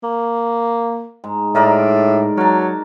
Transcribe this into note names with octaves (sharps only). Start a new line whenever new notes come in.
A#3
G#2
A2 D#4 A#4 D5
F#3 A#4 A5